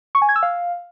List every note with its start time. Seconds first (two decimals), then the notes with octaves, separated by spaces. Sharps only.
0.15 C#6
0.22 G#5
0.29 G#6
0.36 E6
0.43 F5